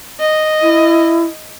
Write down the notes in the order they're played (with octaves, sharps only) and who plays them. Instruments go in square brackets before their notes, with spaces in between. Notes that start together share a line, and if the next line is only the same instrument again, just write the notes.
[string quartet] D#5
[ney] E4